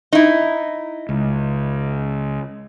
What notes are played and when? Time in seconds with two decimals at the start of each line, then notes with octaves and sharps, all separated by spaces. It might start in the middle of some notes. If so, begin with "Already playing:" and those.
0.13 D#4 E4
1.09 C#2